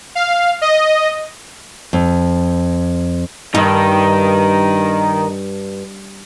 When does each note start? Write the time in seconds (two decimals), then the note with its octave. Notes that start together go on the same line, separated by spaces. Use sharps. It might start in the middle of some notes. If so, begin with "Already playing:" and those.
0.15 F5
0.62 D#5
1.93 F2
3.55 G2 D#3 D#4